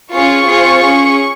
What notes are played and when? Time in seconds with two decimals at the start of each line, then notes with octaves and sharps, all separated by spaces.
0.12 C#4 F4 G#4 C#6
0.46 C4 F4 G#4
0.81 C#4 G#4